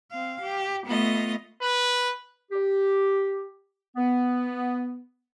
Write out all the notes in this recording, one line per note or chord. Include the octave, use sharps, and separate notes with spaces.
C4 F5
G4
A3 B3 F4 D#5
B4
G4
B3